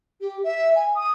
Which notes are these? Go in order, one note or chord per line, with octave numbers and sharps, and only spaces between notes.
G4
E5
G#5
D#6